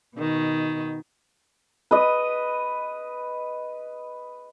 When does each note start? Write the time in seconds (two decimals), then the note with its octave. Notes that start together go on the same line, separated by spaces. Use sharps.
0.16 B2 D#3
1.91 B4 D#5